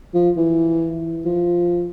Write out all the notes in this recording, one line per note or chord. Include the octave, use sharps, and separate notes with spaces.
F3
E3
F3